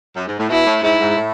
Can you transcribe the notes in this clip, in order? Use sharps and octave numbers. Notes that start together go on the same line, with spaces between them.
F#2
G#2
A2
B2 E4
A2
G#2 E4
G#2
A2